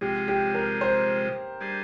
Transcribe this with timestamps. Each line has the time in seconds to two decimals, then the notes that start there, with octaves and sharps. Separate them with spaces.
0.01 C3 F3 G#3 G4
0.28 G4
0.54 A#4
0.81 C5
1.60 G3 D4 G#4 C5